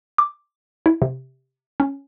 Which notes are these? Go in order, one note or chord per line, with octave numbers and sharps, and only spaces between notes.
D6
E4
C3
C#4